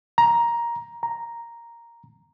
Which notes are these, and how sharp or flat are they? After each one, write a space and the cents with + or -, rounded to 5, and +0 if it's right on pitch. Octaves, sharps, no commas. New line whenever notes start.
A#5 +10
A#5 +0